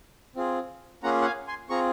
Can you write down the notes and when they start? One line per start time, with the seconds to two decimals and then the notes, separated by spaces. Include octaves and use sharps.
0.36 C4 F4 G#4
1.03 A#3 C#4 F4 G#4 F#5 A#5
1.22 F#5
1.25 F5 G#5
1.47 G#5 C6
1.69 C4 F4 G#4 A#5 C#6